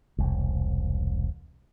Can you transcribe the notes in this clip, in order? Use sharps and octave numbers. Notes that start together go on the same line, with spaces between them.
E1 C2